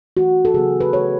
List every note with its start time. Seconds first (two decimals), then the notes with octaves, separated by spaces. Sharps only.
0.17 E3 A3 F#4
0.45 A4
0.54 C#3 F#3 B3 G#4
0.80 B4
0.93 E3 A3 C#5